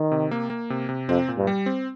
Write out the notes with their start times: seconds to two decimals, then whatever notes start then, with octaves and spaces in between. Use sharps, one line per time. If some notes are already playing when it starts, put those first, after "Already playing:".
Already playing: D#3
0.12 C3
0.31 A#3
0.50 A#3
0.70 C3
0.89 C3
1.09 F2 C4
1.28 A#2
1.37 G2
1.47 G3
1.66 C4